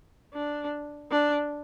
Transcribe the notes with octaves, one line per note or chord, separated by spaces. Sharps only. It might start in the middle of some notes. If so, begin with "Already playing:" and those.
D4
D4